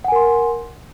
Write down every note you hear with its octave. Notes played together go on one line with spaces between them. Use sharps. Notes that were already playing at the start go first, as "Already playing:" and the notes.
A#4 F#5 G#5 C6